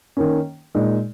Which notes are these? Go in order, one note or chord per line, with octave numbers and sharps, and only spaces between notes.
D#3 A#3 C#4
A#2 G#3 D#4